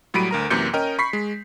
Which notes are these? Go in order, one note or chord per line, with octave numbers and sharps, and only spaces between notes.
A2 F#3 G3 B5 D7 D#7
D2 A#4 A#5
F#2 C3 E3 A#3 G6 C#7
C#4 A#4 D#5 G5
B5 C#6 B6 C7
G#3